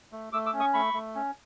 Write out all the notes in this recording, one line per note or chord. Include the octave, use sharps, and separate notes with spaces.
A3
A3 D6 E6
D6 E6
C#4
C#6 D#6
A3 B5 C#6
A3
C#4